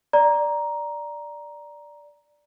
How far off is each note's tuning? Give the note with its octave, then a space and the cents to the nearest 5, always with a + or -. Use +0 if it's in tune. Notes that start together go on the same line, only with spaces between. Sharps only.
D5 +0 A#5 +10